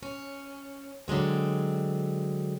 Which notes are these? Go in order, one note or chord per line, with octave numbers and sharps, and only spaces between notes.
C#4
D3 F#3 G#3 C4